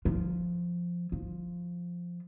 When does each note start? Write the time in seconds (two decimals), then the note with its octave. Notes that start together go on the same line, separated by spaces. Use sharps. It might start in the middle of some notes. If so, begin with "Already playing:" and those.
0.05 F3
1.12 F3